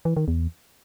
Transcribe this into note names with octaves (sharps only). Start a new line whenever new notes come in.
E3
D#3
E2